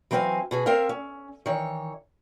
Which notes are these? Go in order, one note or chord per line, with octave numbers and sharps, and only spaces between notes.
E3 F#3 C4 B4 F5 G#5
B2 F#4 G#4
C4 A#4 E5 F5
C#4
D#3 E3 C#5